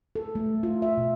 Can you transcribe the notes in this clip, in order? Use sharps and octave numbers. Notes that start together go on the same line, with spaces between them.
A4
A3
F4
E5
B2